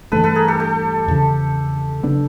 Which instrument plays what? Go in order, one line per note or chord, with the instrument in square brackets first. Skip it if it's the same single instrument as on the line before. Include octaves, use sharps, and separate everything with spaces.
[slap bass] G2 E3 A3 D4 [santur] A4 B4
[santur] A4 B4
G#4 A#4
G4 A4
G4 A4
[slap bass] E2 C#3 F3
C#3 F#3 B3 D4